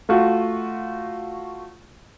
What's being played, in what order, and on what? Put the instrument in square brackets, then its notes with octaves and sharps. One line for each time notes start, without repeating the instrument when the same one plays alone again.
[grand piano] A3 F4 F#4